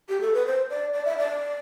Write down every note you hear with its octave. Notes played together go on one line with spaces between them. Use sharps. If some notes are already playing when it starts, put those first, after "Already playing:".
G4
A4
B4
C5
D5
D5
E5
D5